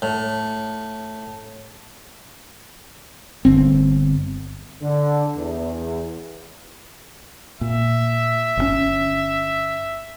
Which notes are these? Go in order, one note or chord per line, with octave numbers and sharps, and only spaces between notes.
A2
G1 C4
D3
E2
A#2 E5
G1 A#2 C#4